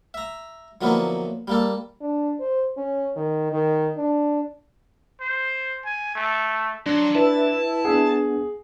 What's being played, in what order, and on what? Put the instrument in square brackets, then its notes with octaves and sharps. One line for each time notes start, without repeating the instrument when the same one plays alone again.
[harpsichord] E5 A#5
D3 F3 F#3 A#3 B3 E4
G3 A#3 A4
[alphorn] D4
C5
C#4
D#3
D#3
D4
[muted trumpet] C5
G#5
A3
[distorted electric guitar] F#3 [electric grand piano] D4 [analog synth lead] C6
[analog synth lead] E4 [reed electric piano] B4 [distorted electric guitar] A5
[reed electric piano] B3 D4 F#5 [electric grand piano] G#4